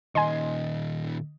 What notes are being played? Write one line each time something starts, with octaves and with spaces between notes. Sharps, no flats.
A#2 D#3 D#5 G#5 C6